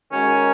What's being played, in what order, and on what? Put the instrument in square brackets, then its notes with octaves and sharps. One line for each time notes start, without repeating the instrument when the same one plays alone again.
[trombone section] D#3 G#3 F#4 A#4 [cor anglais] C#4